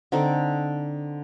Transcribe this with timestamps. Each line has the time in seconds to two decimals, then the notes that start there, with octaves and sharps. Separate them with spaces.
0.12 D3 C4 D#4 A4